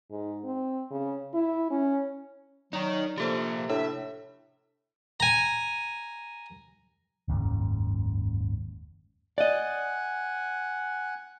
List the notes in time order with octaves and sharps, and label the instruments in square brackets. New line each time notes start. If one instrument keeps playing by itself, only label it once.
[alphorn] G#2
C4
C#3
E4
C#4
[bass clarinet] F#3 [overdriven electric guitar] D#4 A#4 [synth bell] D5
[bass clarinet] C3 [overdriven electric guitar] F3 A#3 [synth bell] G4 A4 C5
[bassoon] A2 [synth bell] D4 [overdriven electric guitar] E5
[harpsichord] G#5 A#5
[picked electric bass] F#1 D#2 G#2 C#3
[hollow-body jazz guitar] D5 D#5 [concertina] F#5 G#5